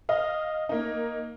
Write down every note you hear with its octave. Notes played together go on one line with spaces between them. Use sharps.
D#5 F5
A#3 D#4